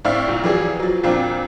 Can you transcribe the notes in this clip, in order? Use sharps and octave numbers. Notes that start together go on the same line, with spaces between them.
A2 C4 E4 D5 F5
C2 A#2
F2 E3 F#3 G4 G#4 D5
F3 F#3
F2 A#2 A#3 C4 D4